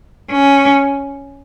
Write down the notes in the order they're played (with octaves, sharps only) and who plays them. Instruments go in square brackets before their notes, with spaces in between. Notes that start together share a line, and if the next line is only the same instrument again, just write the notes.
[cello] C#4